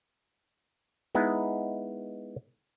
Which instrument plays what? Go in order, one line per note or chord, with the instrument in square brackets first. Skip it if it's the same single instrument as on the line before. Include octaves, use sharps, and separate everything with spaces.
[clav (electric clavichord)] G#3 B3 D#4 E4